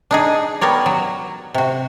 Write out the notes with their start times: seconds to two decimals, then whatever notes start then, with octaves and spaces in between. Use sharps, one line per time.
0.11 D4 D#4 G#4
0.61 B3 G4 A#4 C#5 D5
0.86 F#3
1.54 C3 F#4